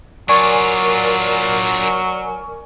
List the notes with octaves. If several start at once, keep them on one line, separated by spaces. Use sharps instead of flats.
F#3 D4 F4 A#4 D5 G#5 C#6